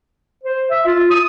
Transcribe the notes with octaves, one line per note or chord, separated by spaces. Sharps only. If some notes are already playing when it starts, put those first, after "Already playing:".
C5
E5
F4
D#6